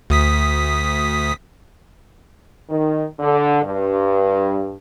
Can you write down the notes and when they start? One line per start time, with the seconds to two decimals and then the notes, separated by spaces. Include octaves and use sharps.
0.10 D2 D#6 B6
2.70 D#3
3.20 D3
3.63 G2